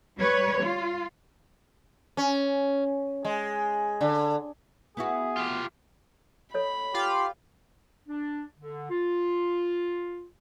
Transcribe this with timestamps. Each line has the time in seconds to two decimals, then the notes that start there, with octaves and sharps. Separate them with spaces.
0.18 G3 B4 C#5
0.61 F4
2.17 C#4
3.25 G#3
4.01 D3
4.97 B3 E4 F#4 G#4
5.37 F4 G4
6.54 A4 C#5 D#5 B5
6.94 F4 G4 F5
8.08 D4
8.58 D3
8.90 F4